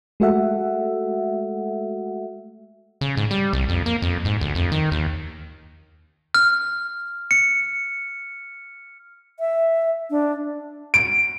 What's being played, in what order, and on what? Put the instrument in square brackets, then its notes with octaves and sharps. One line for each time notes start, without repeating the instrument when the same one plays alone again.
[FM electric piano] G#3 A3 F#4 A4 E5 F#5
[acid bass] C#3
G#2
G3
C2
F2
A#3
F2
G#2
D2
F2
D#3
D#2
[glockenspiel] F6
C#7
[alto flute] E5
D4
[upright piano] D7